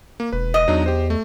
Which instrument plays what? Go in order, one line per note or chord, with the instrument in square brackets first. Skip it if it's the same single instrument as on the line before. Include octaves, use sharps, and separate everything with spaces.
[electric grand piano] A#3
[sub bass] E1 [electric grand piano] B4
[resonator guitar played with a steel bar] D#5
[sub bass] E2 [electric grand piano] F#3 D4 D#4
[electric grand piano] G4 C5
A3